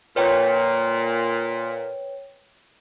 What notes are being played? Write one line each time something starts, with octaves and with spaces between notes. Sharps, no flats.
A#2 B4 C#5 G5